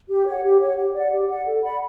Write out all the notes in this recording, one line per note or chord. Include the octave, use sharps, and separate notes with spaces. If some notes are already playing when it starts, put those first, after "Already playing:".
G4
C#5 F#5
G4
C#5 F#5
G4
D5 F#5
G4
D5 F#5
A4
D5 F#5 B5